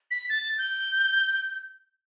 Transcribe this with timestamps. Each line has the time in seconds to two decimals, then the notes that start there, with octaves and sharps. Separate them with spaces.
0.11 B6
0.29 A6
0.58 G6